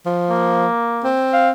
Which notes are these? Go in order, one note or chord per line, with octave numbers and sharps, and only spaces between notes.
F3
A#3
C4
F5